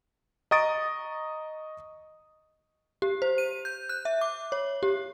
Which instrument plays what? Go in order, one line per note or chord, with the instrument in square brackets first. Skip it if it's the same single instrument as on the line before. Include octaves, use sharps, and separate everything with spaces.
[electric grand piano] D#5 A#5 C#6 D#6 A6 D7
[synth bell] G4
C5
D#7
G6
F#6
E5
D6
C#5
G4